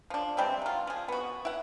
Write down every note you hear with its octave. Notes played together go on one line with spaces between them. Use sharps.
F3 D4
E3 G3 G#3 C4
F#3 F4
F3 G#4
B3 F#4
E4 F#5